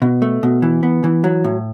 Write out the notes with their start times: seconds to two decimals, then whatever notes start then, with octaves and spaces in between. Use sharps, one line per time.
0.02 B2
0.22 A3
0.43 B2
0.62 E3
0.83 B3
1.04 E3
1.24 F#3
1.44 A2